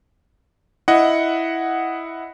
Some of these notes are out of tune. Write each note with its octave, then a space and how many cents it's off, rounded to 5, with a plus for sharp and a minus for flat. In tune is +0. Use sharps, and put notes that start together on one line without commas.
E4 +0 D#5 +0 F#5 +0